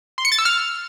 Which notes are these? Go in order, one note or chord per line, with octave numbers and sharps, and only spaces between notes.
C6
C#7
A6
E6
F6